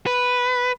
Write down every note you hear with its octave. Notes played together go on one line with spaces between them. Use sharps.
B4